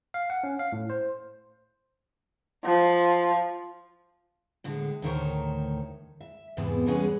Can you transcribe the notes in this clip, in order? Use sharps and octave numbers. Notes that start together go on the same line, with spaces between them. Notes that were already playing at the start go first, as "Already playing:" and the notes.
F5
F#5
C#4
F5
A2
C5
F3
A2 D3 G#3
D2 A2 D#3 A#4 C5 C#5
E5
E2 G#2 C3 B3 E4
E3 G3 G#3 B3 C#4 G#4